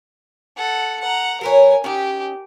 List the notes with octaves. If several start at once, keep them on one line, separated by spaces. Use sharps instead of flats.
A4 F#5
F#5 A#5
F#3 A#4 B4 C#5 G#5
C#4 D#4 G4